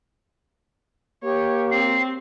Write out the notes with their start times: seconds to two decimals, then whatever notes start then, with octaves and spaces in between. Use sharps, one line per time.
1.23 A#3 G4 C#5
1.71 C4 C7